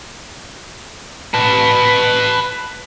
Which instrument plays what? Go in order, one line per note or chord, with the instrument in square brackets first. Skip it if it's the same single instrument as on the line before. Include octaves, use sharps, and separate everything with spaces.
[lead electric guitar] B4 A5